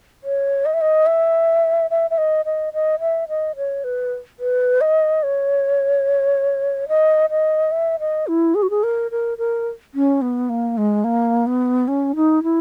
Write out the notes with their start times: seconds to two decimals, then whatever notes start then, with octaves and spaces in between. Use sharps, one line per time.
0.24 C#5
0.65 D#5
0.74 E5
0.81 D#5
1.06 E5
1.90 E5
2.10 E5
2.18 D#5
2.45 D#5
2.73 D#5
3.00 E5
3.28 D#5
3.56 C#5
3.84 B4
4.40 B4
4.81 D#5
5.23 C#5
6.88 D#5
7.30 D#5
7.71 E5
8.00 D#5
8.27 E4
8.55 G#4
8.62 F#4
8.70 G#4
8.83 A#4
9.11 A#4
9.38 A#4
9.94 C#4
10.21 B3
10.49 A#3
10.77 G#3
11.04 A#3
11.47 B3
11.88 C#4
12.15 D#4
12.43 E4